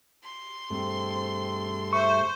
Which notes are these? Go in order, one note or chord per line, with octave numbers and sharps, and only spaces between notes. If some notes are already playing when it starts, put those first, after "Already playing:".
C6
G2 A3 C4
C5 E5 C#6